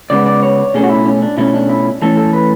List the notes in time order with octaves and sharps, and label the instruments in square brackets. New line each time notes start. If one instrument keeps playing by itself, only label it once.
[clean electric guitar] C#3 G#3 B3 D5
D5
C#5
B2 A3 C#4 G#4
F#4
E4
C#4
D4
B2 A3 C#4 E4
D4
E4
E3 A3 C#4 A4
A4
B4